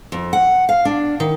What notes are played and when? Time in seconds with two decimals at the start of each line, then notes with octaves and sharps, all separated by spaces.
0.12 F2
0.33 F#5
0.69 F5
0.85 D4
1.20 D#3